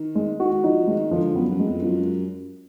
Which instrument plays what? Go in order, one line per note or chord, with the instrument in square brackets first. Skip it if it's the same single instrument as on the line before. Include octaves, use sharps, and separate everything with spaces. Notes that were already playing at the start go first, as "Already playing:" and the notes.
Already playing: [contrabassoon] D#3
[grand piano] G#3
[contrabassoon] D#3 [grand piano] F#4
[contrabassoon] F3 [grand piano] D#4
[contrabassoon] D#3 [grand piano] G#3
[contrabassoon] D3 [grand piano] F3
[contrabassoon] F#2 [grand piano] B3
[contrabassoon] F#2
[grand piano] G#3
[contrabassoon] F2
[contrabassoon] F#2 [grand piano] F4